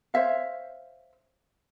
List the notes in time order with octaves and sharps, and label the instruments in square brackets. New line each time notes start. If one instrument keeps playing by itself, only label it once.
[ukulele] C5 C#5 E5 F5